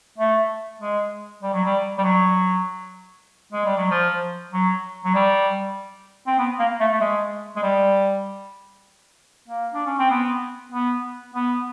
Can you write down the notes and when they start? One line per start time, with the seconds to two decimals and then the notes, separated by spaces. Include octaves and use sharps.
0.18 A3
0.80 G#3
1.43 G3
1.53 F#3
1.65 G3
1.98 G3
2.04 F#3
3.52 G#3
3.65 G3
3.78 F#3
3.91 F3
4.52 F#3
5.05 F#3
5.15 G3
6.27 C4
6.39 B3
6.59 A#3
6.80 A3
6.92 A3
7.01 G#3
7.56 G#3
7.63 G3
9.48 A#3
9.74 D4
9.86 C#4
9.99 C4
10.11 B3
10.72 B3
11.34 B3